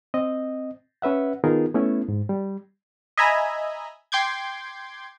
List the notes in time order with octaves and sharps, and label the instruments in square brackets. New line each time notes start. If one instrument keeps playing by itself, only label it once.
[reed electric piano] C4 D#5
C#4 B4 E5 F#5
D#3 B3 D#4 F4 G#4 A#4
A3 B3 C#4 E4
G#2
G3
[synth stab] D#5 E5 G#5 A#5 B5
G5 C6 D6 G6 G#6